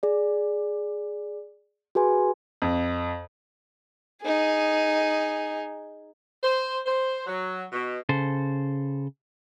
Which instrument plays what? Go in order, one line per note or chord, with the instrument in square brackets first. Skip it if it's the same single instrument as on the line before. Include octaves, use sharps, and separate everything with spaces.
[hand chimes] G#4 D5
F#4 G#4 B4 G#5 C6
[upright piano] F2
[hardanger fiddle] D#4 G#4
[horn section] C5
C5
F#3
B2
[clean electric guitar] C#3 A4 C5